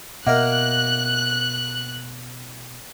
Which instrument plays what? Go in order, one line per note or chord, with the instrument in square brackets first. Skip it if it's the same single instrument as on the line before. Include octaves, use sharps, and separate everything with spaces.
[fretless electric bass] B2 [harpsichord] A#3 A#4 [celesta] D#5 E5 F#5 [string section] F#6